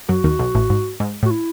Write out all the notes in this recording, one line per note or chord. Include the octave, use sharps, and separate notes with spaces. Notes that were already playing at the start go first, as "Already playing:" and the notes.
F#2 F#3 F#4
D#2 D#3
B1 B2
A1 A2
G#2
G#2
A2 F#4
E4